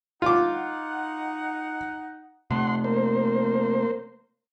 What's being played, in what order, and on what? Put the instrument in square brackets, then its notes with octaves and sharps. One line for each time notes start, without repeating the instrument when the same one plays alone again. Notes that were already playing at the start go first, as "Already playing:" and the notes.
[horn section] D#4 F#5 [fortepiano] F4 D6
[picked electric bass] C3 A3 [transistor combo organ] F#5 C6
[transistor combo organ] A#3 C5